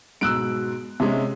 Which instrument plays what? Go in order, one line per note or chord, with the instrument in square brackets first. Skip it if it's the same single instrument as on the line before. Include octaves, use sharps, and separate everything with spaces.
[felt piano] G#2 B2 [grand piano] E6 F#6 D7
[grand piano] C3 G#3 C#4 [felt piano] E5 C6